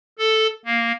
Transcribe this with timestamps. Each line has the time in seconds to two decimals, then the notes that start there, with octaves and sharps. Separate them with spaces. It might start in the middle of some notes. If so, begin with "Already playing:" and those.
0.18 A4
0.65 A#3